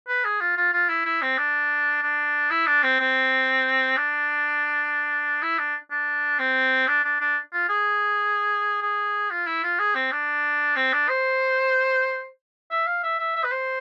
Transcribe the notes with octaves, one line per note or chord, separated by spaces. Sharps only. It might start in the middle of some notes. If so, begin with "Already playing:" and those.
B4
G#4
F4
F4
F4
E4
E4
C4
D4
D4
E4
D4
C4
C4
D4
E4
D4
D4
C4
D4
D4
D4
F4
G#4
G#4
F4
E4
F4
G#4
C4
D4
C4
D4
C5
E5
F5
E5
E5
E5
B4
C5